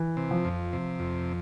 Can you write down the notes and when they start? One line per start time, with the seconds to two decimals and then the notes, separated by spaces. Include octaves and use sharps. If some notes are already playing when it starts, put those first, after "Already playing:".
Already playing: E3
0.17 C3
0.31 F3
0.45 F2
0.73 C3
1.00 F2